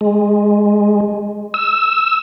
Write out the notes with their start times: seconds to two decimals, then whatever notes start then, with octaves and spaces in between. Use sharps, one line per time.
0.01 G#3
1.54 E6